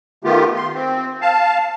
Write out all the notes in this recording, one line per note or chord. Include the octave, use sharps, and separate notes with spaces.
D#3 A3 B3 F4 G4
C6
C4
F5 A5